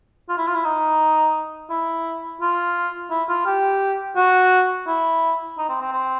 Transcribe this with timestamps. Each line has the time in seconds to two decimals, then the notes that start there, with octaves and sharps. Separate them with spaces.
0.29 F4
0.38 E4
0.47 F4
0.55 E4
0.65 D#4
1.70 E4
2.41 F4
3.11 E4
3.29 F4
3.46 G4
4.17 F#4
4.87 E4
5.58 D#4
5.69 C4
5.81 C4
5.92 C4